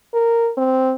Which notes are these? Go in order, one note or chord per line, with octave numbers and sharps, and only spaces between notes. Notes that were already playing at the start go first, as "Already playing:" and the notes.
A#4
C4